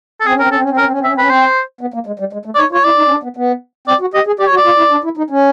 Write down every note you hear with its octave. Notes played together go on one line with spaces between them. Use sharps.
A4
C4 G#4
C#4
C4 A#4
C#4
A4
C4
C#4
C4
C#4 A#4
C4
C#4
C4
C#4 E5
C4
C#4 B4
C4 C5
B3
A#3
G#3
G3
G#3
A3
D5
D#4 C#5
F4 C#5
E4 D5
D#4
C#4
D4
B3
B3
C4 D5
F#4
G4 D#5
G#4
G4 D5
C#5
F#4
D5
F4
E4
D4
E4
D#4
C#4